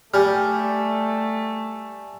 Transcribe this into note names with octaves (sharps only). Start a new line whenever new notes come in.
G3 A3 G#5 F6